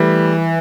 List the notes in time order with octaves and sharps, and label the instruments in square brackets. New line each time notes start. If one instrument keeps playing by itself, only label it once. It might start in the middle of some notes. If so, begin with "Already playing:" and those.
Already playing: [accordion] E3 [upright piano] G3 A3